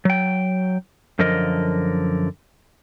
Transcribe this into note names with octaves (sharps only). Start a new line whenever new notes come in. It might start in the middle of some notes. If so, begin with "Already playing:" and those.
F#3 G5
F#2 D3 F3 A#4 D#5